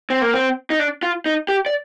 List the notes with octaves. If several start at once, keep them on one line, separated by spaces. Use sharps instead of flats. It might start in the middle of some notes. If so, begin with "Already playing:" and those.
C4
A#3
C4
D#4
D4
F4
D#4
G4
D5